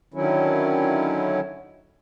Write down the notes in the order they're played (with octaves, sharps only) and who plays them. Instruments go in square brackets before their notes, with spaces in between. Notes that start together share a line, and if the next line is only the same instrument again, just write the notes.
[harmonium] D3 D#3 F#3 C#4 E4